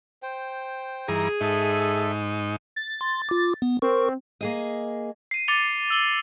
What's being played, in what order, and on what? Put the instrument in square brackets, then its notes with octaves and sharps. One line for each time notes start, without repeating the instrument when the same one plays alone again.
[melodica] C5 G5
[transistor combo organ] G2 E3 A#5 [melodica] D#4 [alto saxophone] G#4
[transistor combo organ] G#2 D#4 [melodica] A4 E5
[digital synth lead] A6
[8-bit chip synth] C6
F4 D6
B3
[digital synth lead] C4 [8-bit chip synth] A#4 C#6
[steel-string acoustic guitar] A#3 G#4 D#5
[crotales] C7 D#7
D6 A6 C#7 D#7 F7 G7
E6 F#7 G7